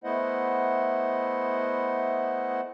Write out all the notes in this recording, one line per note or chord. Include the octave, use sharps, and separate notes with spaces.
A3 B3 E4 C5 D#5 F#5